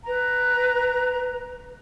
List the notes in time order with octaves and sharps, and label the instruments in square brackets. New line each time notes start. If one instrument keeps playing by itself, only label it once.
[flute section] B4 A#5